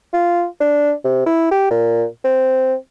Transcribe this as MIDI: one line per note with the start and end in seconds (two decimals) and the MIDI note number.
0.13 0.45 65
0.60 0.93 62
1.04 1.23 48
1.26 1.47 64
1.51 1.70 67
1.70 2.05 46
2.24 2.74 60